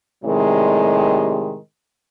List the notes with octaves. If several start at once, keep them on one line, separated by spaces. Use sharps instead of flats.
A2 C3 D#3 G3 G#3